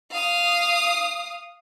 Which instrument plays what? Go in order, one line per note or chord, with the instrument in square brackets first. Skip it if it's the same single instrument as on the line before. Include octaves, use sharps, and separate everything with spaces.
[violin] F5 D#6